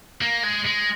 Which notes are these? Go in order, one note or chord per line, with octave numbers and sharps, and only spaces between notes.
A#3
G#3
G#3